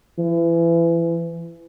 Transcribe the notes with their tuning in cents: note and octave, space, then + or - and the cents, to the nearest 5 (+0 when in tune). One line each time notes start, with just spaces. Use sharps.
E3 +30